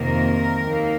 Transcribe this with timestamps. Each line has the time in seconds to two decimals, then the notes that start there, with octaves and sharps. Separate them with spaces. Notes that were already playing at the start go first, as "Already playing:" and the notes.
Already playing: F2 C3 D#3 A#3 A#4
0.61 D#2 D#3 A#3